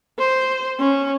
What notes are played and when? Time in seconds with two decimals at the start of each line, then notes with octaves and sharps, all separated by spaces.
0.19 C5
0.79 C#4